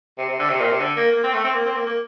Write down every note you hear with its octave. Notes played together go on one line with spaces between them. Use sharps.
C3
C3
D3
C3
A#2
C3
D3
A#3
A#3
C4
A3
C4
A#3
C4
A#3
A#3